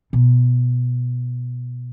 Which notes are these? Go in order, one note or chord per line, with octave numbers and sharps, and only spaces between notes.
B2